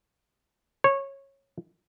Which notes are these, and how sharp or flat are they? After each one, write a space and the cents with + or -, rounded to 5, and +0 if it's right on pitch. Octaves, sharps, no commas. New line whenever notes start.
C#5 -15